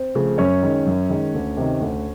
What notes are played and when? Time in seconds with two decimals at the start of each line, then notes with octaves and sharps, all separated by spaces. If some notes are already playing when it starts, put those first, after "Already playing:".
Already playing: C4 C5
0.15 C#3 F3 A3
0.38 F#2 C#4 C#5
0.63 D#3 G#3
0.86 F#2
1.10 D#3 G#3
1.34 D2
1.57 C3 D#3
1.81 D2